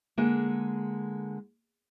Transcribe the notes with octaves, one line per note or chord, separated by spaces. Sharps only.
D3 G#3 A#3